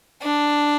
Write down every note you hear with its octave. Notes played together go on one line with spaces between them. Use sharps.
D4